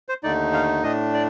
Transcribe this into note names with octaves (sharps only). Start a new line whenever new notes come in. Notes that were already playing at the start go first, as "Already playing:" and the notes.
C5
D#2 D3 A3 D#4 D5
F5
A2 A3 D4 D#5
D5